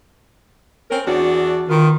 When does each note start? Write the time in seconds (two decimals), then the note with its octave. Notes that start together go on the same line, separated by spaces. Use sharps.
0.90 C4 C#4 A#4
1.06 E2 D4 F#4
1.69 D#3 B3 F4